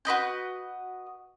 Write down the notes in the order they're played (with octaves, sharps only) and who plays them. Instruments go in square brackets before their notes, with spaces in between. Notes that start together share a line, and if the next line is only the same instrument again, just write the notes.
[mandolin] F#4 B4 D#5 G6